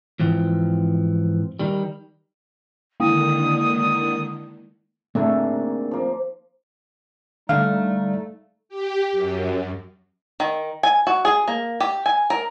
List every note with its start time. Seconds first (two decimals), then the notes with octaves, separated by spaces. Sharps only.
0.20 G#2 E3 F3 C4
1.59 D#3 G3
3.00 D3 D#3 G#3 A#3 E4 D#6
5.15 D#3 A3 A#3 C4 D4 G#4
5.91 F3 A#3
7.49 D3 G3 A3 D#4 F5
8.69 G4
9.12 F#2
10.40 D#3
10.83 G#5
11.07 F#4
11.25 G#4
11.48 A#3
11.80 G4
12.06 G#5
12.30 A#4